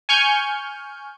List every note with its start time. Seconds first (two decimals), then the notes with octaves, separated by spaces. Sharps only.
0.09 G#5 C#6 F6 G6